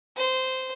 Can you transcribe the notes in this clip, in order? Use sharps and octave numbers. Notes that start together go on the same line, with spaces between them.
C5